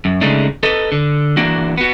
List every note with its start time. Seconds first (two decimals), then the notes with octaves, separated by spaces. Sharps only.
0.05 F#2
0.21 C#3 G#3 A3 D4 D#4
0.63 A4 B4 D#5
0.92 D3
1.37 E3 A#3 D4 F#4
1.78 B3 F#4